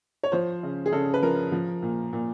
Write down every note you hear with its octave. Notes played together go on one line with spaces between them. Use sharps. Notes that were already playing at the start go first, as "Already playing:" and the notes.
C#5
F3 C5
C#3
G#4
C#3 A4
B4
F3 A#4
F3
A#2
A#2